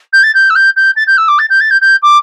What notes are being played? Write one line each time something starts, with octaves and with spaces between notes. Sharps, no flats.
G6
A6
G6
E6
G6
G6
A6
G6
E6
D6
A6
G6
A6
G6
G6
D6